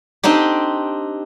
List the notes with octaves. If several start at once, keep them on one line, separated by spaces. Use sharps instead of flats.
C4 D4 D#4 G4